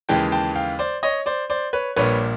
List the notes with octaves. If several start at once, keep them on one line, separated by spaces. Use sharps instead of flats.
D#2 C#3 E3 G#3 G5 A5
G5 A5
F5 G5
C5 D5
C#5 D#5
C5 D5
C5 D5
B4 C#5
A#1 A#2 G3 A#3 B4 C#5